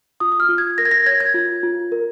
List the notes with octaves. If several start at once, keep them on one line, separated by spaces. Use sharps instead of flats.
F4 D#6
D#6
F6
F4
G#6
A#4 A#6
G#6
A#6
C#5 G#6
G#6
F4
F4
A#4